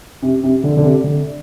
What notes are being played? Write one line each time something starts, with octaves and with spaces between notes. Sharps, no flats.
C3
C3
D3
D3
C3
D3